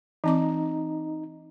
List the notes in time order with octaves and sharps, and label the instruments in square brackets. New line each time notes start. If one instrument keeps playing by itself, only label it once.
[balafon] E3 C4 D6 [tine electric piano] D#4